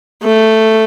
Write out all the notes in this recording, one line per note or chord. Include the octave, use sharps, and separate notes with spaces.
A3